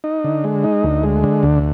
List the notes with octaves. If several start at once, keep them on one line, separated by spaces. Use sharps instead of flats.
D#4
D3
G#3
D#4
D2
G#3
D3
D2